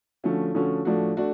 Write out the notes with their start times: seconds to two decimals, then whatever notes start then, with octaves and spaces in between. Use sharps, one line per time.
0.24 D3 F3 A3 C#4 F#4
0.55 D3 F3 A3 C#4 F#4
0.85 A2 F3 A3 D4 F#4
1.17 A3 D4 F#4